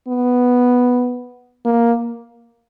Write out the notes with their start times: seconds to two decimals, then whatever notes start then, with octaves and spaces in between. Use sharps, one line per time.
0.08 B3
1.65 A#3